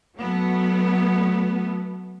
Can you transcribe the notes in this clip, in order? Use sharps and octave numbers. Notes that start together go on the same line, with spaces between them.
F#3 A3 B3